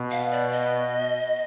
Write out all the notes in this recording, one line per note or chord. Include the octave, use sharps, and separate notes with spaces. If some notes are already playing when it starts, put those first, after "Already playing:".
Already playing: B2
F5
D5
D#5